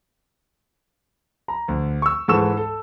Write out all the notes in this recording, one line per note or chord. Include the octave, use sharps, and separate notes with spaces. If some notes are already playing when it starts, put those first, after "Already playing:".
A#5
D2
C#6 E6
G#2 E3 A4 C#6 E6 E7
A4